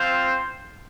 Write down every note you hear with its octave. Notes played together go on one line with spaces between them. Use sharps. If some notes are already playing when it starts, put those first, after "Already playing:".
Already playing: C4 F4 C5